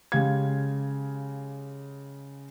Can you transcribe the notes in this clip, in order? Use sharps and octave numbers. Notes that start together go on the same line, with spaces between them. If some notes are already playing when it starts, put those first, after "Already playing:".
C#3 G#3 G4 F5 G#6